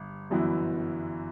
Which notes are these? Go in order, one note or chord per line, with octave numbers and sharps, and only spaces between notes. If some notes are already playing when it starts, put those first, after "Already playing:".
Already playing: G1
G1 F#2 E3 B3 E4